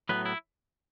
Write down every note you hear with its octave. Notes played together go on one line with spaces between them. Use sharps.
A2 F#3 B3 B4
E4